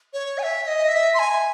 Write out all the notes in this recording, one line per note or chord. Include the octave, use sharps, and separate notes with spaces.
C#5
G#5
E5
E5
D#5
E5
C6
G#5